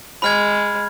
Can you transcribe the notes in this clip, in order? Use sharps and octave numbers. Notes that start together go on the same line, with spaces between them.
G#3 B5 F6 G#6